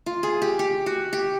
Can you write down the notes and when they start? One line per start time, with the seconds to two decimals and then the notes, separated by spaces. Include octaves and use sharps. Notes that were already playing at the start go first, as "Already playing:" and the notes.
0.06 F4
0.23 G#4
0.42 G4
0.59 G4
0.86 F#4
1.13 G4